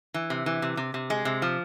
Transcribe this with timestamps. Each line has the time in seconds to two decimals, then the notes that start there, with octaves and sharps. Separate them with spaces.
0.14 E3
0.30 C3
0.46 E3
0.62 C3
0.77 C3
0.94 C3
1.10 G#3
1.25 C3
1.42 F3